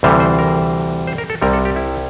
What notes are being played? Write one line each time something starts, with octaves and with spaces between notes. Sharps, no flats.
D2 C3 E3 G3 C5
C5
A#4
C5
A#4
A4
C2 C3 G3 A#4
A4
G4
E4